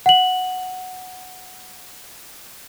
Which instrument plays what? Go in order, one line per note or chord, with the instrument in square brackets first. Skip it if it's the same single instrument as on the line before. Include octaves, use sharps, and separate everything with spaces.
[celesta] F#5 F#7